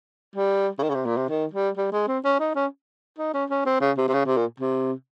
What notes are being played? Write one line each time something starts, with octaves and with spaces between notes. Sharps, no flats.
G3
C#3
D#3
C#3
C3
A#2
C3
D#3
G3
G3
G#3
C4
C#4
D#4
C#4
D#4
C#4
C#4
C4
C#3
C3
C3
C#3
C3
A#2
C3